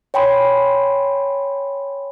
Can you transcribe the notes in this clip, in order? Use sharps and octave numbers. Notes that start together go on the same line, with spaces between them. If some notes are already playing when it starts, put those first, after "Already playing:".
C#5 G5 G#5 B5 C6